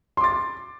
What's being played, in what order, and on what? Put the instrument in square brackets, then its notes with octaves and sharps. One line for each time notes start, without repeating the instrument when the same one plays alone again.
[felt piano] C6
D6
A6